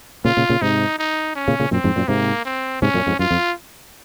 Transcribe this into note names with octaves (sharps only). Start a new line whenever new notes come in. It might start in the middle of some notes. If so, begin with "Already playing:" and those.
A#2 C#3 F4
A#2 C#3
A#2 C#3
G#2 C3 D#4
D#4
C#4
A#2 C#3
A#2 C#3
F#2 A#2 C4
F2 G#2
F#2 A#2
G#2 C3 A#3
C4
G#2 C3 C#4
F#2 A#2
F2 G#2
F#2 F4
F2